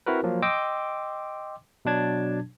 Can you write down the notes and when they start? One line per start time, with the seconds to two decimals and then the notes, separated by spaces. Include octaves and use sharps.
0.06 C4 E4 F#4 A#4 B4
0.24 F3 F#3 A#3
0.42 D#5 G5 C6 D6 E6
1.85 B2 F#3 D4 A5 G#6